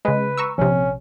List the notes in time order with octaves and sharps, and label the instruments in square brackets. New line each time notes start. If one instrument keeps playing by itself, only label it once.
[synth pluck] C#3 G#3 [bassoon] B4
[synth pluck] A#5 C#6 E6
[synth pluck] A#1 C3 [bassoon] C#4